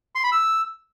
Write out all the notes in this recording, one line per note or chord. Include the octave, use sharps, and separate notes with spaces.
C6
B5
E6